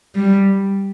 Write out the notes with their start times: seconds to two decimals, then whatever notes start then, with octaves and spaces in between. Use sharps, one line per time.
0.15 G3